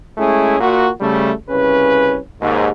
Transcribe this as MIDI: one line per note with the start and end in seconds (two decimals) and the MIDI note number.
0.18 0.56 56
0.18 0.56 57
0.18 0.56 61
0.18 0.56 64
0.18 0.56 68
0.59 0.88 46
0.59 0.88 66
1.00 1.31 49
1.00 1.31 55
1.00 1.31 57
1.49 2.16 36
1.49 2.16 49
1.49 2.16 61
1.49 2.16 71
2.40 2.69 39
2.40 2.69 44